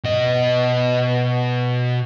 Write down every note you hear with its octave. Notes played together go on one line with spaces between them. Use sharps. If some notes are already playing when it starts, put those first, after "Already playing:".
B2 D#5